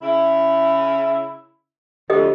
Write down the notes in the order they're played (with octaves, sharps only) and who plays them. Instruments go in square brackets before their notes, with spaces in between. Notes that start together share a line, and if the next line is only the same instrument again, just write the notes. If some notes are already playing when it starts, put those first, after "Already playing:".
[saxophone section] C#3 E4
[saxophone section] D2 D3 F3 [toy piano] G4 A4 D#5